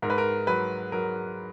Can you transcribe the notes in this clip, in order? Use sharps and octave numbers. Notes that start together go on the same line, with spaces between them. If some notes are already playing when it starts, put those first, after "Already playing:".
G#2 A#4
B4
A#4
F#3 B4
F#3 A#4